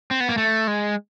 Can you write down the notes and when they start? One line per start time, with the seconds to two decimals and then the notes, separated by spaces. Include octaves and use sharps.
0.11 C4
0.20 B3
0.29 A#3
0.38 A3
0.67 G#3